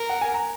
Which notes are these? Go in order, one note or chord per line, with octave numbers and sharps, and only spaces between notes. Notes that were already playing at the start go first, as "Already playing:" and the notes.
Already playing: A#4
F#5
G#5
A#5